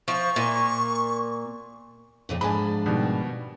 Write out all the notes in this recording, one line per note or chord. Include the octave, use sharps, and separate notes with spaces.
F3 C#6
A#2
F2 A#2 C#3
G#2 F3 D4 G#5 B5
B2 D#3 G3